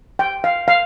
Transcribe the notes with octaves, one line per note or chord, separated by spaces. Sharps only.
G5
F5
F5